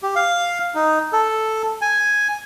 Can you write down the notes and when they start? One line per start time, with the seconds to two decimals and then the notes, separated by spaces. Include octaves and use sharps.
0.03 G4
0.16 F5
0.75 D#4
1.13 A4
1.81 G#5